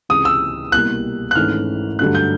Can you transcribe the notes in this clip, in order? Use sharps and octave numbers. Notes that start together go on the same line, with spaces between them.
C#2 C3 E3 G#3 D#6
E6
C2 B2 G3 A#3 F#6
F#6
G#1 G#2 E3 A3 C#4 F6
G2 D3 F#3 A3 D4 F#6
G6